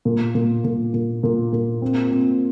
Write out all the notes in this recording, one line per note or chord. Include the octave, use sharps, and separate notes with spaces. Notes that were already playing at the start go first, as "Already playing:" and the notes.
A#2
A#2
A#2
A#2
A#2
A#2
C4
C4